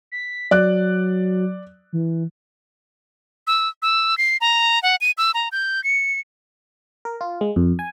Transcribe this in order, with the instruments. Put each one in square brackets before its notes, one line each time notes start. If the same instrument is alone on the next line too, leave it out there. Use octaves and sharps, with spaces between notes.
[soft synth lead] B6
[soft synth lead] F#3 [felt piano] D5 F#6
[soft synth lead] E3
[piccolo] E6
E6
C7
A#5
F#5
D#7
E6
A#5
G6
C#7
[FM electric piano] A#4
F4
G#3
F2
G#5